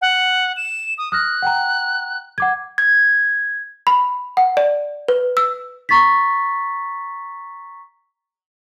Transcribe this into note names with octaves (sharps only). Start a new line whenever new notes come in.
F#5
E7
D#6
D#6 F6 F#6 A#6
F#5 G5 A#5
F#5 D6 G#6
G#6
B5
F#5
D5
B4
E6
A#5 C#6 A6 B6